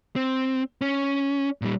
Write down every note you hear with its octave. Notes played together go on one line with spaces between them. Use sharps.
C4
C#4
A#2 G3